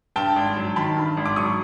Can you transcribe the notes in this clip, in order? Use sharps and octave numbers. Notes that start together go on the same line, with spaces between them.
G2 G5 A5
G#1
F#3
D#3 A5 B5
G2
G#1
D6
F#3 C#6 D#6